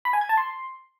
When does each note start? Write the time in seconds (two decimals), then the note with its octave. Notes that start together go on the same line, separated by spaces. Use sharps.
0.05 B5
0.13 G#5
0.21 G#6
0.29 A5
0.37 C6